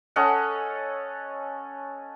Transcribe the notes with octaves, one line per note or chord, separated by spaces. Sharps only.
C#4 A4 D#5 F#5